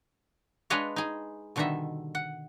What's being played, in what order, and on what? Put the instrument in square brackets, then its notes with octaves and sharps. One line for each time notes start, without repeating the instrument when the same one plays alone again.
[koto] G#3 D4 B4 C#5 D#5 F5
D#4 G#4
B2 D3 D#3 G3 D#5 E5
F#5